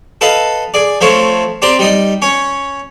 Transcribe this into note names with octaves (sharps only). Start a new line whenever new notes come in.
A4 B4 D#5 F5
G#4 D5
F3 A3 C4 C5 C#5
C4 G4 D5 A#5 C6
G3 D#4 D#5
C#4 C#5